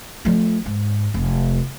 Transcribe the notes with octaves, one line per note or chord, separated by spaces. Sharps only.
F3 A3
G#2
F1